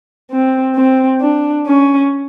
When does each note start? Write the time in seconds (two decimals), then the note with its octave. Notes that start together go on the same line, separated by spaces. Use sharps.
0.31 C4
0.76 C4
1.21 D4
1.67 C#4